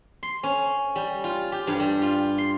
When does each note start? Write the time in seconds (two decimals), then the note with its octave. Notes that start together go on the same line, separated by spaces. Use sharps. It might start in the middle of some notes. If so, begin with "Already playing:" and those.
0.23 C6
0.43 C#4
0.95 G3
1.24 F4
1.52 G4
1.67 G2
1.80 G3
2.02 F4
2.38 C6